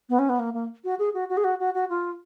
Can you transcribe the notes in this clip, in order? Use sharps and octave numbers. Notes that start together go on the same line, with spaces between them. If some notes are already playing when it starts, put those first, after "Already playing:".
B3
C#4
B3
A#3
A#3
F#4
G#4
F#4
F#4
G#4
F#4
F#4
F#4
F4